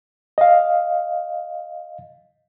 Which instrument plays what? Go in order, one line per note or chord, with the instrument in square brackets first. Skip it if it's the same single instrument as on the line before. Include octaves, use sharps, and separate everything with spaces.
[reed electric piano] D#5 F5